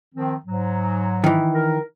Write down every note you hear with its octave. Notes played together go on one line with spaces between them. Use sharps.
D#3 F3 C4
G#2 F#3
D#3 E3
A#4